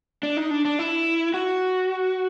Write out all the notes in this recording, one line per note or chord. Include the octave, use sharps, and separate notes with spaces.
D4
D#4
D4
D4
E4
F#4